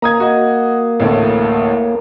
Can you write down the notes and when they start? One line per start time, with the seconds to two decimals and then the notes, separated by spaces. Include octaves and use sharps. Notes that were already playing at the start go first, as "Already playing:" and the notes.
0.02 A#3 A#5 D#6 G#6
0.20 F#4 D#5
1.00 A1 D2 A2